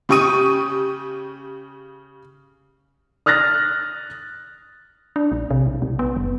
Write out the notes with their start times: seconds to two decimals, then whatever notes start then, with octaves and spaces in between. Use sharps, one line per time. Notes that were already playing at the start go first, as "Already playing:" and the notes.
0.09 C#3 G4 C#6 D#6 D#7
3.26 D#6 F6 F#6 A6 A#6
5.16 D4
5.32 A#1
5.50 C3
5.67 B1
5.82 B1
5.99 B3
6.16 F#1